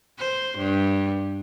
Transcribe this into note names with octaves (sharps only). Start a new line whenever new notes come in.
C5
G2